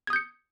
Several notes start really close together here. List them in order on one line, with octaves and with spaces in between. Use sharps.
G#6 D#6 G6 C#7